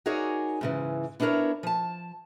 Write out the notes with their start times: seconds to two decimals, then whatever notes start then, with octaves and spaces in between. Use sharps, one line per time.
0.06 D#4 F#4 G#4 A#4 C#5 D5
0.61 G#2 C#3 E3
1.20 B3 D4 E4 A4 A#4 C#5
1.63 F3 A5